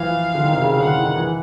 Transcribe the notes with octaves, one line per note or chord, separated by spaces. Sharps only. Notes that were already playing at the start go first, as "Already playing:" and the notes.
Already playing: E3 F3 F5
D3
D#3
C3
C#3
C#3
D3 F#5
D#3
E3